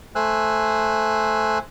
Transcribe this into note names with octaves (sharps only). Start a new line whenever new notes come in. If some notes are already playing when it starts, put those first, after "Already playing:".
A3 C5 G#5 E6 F#6